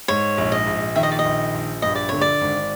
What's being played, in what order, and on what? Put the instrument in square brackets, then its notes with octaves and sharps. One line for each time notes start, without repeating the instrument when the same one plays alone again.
[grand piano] G#2 [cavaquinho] C#5
[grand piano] A#1
[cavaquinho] D#5
[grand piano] A#1
[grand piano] D#3 [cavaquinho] E5
[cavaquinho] D#5
D5
D#5
[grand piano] A#1
A#1
[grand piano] G2 [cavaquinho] D#5
[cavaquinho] D5
[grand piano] D3 [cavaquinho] C#5
[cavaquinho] D5
[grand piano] G#1